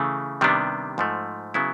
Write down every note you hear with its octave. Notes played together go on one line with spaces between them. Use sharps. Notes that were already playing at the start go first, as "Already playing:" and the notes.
Already playing: C#3 E3 A3
C3 D#3 G3 B3 D4
G#2 F3 A3
C#3 F#3 B3 E4